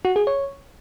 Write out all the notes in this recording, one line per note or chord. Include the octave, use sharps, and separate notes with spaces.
F#4
G#4
C#5